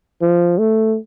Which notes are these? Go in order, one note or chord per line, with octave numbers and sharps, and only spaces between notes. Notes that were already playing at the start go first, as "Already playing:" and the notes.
F3
A3